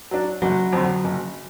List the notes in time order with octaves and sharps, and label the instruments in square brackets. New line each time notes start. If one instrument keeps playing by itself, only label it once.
[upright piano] F#3 D4
[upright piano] F#1 [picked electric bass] F#3
[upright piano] F2 D3
F#1